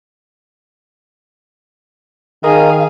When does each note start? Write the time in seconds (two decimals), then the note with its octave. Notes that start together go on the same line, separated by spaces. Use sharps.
2.44 D#3 G#4 A#4 D#5 F5